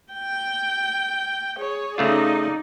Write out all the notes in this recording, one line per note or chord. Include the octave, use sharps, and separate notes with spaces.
G5
G#4 C#5
C#3 A3 D#4 F4 D5